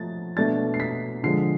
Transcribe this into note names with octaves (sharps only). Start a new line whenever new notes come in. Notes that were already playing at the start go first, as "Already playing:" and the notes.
Already playing: F3 A3 A6
B2 A3 D4 A6
C7
B6
D3 F3 G#3 C7